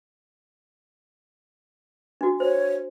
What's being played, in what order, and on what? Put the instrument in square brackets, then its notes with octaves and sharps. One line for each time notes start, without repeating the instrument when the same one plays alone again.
[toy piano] D4 F#4
[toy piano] C5 [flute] C#5